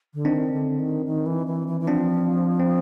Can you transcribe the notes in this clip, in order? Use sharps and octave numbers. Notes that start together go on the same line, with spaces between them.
D3
D#3 C4 D4
D3
D#3
D#3
E3
E3
E3
E3
F3 C4 D4
C4